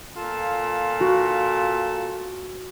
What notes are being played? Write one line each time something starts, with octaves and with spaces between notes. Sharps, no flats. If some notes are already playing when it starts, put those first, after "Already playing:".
A#2 F4 A4
F#4